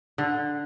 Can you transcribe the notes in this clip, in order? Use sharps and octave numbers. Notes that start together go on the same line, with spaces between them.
D3